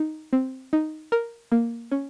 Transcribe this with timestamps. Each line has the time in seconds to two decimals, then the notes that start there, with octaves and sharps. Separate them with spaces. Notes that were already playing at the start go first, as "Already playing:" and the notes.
Already playing: D#4
0.33 C4
0.73 D#4
1.12 A#4
1.52 A#3
1.91 C#4